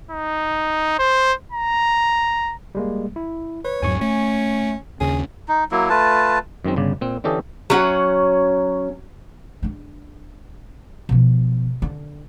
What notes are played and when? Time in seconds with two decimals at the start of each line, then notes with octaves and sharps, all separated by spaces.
0.11 D#4
0.99 C5
1.52 A#5
2.75 G3 G#3 A#3
3.16 E4
3.65 B4 C#5
3.82 E2 G#2 F#3 G#5 C#6
4.01 A3 C#4
5.01 D#2 C#3 C#4 G#4
5.48 D#4
5.72 F#3 A#3 E4
5.90 A3 F4 B4 A5
6.65 F#2 D#3 G#3 C4
6.76 G1 C#3 D5
7.01 A#2 C4
7.24 D3 E3 C#4 G4 A4 D#5
7.70 F#3 C#4 F#5
9.62 G#3 D4
11.09 B2 F3
11.82 D3